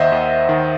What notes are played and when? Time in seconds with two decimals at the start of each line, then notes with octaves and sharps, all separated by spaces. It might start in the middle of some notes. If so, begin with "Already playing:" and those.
Already playing: D#2 D#3 C5 D#5 E5 F#5
0.12 D#2
0.49 D#3